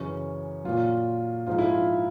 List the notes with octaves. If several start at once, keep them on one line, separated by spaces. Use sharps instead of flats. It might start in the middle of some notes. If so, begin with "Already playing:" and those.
Already playing: F#2 C#3 E3 C#4
A#2 F#3 F4
G#2 F3 F4
E4
F4